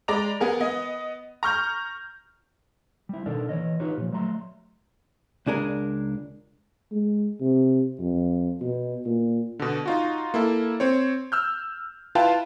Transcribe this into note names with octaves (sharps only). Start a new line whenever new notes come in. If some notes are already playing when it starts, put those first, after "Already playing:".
G#3 D5 A#5 B5 F7
B3 G#4 A#4
B3 D#5
A#5 C#6 F6 G6
G3 E4
B2 D#3 D4 A4 A#4 D5
E3 C#5 D#5
D#4 F4 G4 B4 C#5
A#2 F3
F#3 A3 E5 A#5 C6
C#2 D4 G#4 A#4
G#3
C3
F2
B2
A#2
B2 D3
D#4 F4 F#4
A#3 E4 A4
C4 C5 C#5
E6 F6 G6
E4 F4 B4 F5 G5 A5